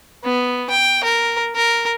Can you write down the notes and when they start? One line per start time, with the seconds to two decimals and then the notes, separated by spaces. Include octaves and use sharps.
0.24 B3
0.70 G5
1.04 A#4
1.56 A#4